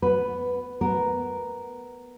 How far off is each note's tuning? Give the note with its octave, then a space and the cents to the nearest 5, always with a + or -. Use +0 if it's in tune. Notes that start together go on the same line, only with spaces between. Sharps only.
B3 +0 B4 +5
B3 +0 A#4 +0